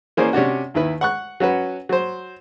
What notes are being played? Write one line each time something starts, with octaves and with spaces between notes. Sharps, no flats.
E3 A#3 C#4 G#4 C5 D5
C3 C#4 D4 F#4
D#2 D#3 E4 B4
F#5 C#6 F#6
F#3 C#4 F#4 B4
F#3 C5